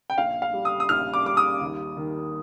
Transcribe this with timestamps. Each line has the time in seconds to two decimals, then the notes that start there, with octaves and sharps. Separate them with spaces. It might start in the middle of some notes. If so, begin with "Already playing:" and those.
0.10 G5
0.18 A#1 F5
0.42 F5
0.54 G3
0.65 D#6
0.80 D#6
0.89 A#1 F6
1.14 D6
1.25 G3 D6
1.37 D#6
1.61 D#2
1.97 D#3